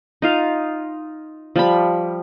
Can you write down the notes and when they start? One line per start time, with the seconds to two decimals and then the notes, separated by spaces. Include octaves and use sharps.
0.22 D#4 F4 F5
1.56 F3 G3 B5